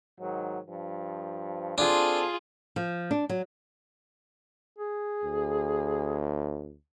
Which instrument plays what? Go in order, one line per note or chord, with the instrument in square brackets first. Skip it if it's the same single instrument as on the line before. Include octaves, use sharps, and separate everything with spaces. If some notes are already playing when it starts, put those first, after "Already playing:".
[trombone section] G#2 D#3 F#3
G2 F3
[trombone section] C4 A4 [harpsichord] D4 [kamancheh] F4 G#4
[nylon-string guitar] F3
D4
F#3
[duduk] G#4
[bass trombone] D2